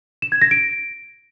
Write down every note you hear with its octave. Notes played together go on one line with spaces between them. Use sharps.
E7
G#6
A#6
D7